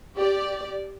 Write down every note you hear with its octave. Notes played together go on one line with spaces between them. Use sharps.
G4 D5